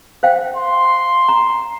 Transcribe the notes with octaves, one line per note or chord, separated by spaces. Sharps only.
C5 F5 G5
C6
A#5